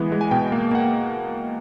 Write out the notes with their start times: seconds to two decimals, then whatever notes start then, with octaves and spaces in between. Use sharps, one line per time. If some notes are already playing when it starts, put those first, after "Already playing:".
Already playing: E3 G#3 B3
0.12 G#3
0.21 G#5
0.31 B2 G5
0.52 A#3
0.71 A#3 F#5